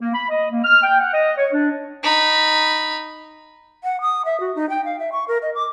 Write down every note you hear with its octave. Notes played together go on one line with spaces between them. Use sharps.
A#3
B5
D#5
A#3
F6
G5
F#5
D#5
C#5
D4
D#4 B5
F#5
D#6
E5
F#4
D#4
G5
F5
E5
C#6
A#4
D#5
D6